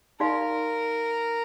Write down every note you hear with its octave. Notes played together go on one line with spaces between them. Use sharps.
D#4 G4 A#4 D5 F5 C6